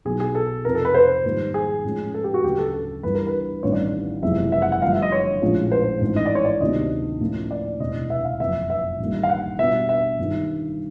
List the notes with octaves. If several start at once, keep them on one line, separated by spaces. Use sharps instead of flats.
B1 B2 F#3 G#4
G#4
A4
F2 C3 F3 A#4
A4
B4
C5
G#2 D#3 G3 A#3
G#4
A2 F3 G#3 C#4
A4
G4
F#4
D2 C#3 F#3 G4
A4
A4
G1 G2 E3 G3 B4
A#4
B4
A1 G2 D#3 G3 C4 C#5
D5
F#1 E2 C3 F3 G#3 E5
E5
F#5
F#5
G2 D3 F3 A3 F5
E5
D#5
C#5
A#1 A2 F3 G#3 C#4
C5
A1 G#2 E3 G#3
D#5
D5
C#5
D5
D2 C3 D#3 F#3 B3 D#5
A2 F3 A#3 C#4
D5
E1 D2 C3 E3 D#5
E5
F5
F#1 F2 C#3 E5
E5
A1 G2 D#3 G3 A#3
F5
F#5
B2 G3 B3 D4 E5
E5
G1 G2 D#3